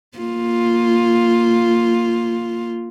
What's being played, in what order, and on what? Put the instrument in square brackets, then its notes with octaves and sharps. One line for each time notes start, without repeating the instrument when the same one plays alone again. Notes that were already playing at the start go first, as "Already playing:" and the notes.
[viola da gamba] A#3 F4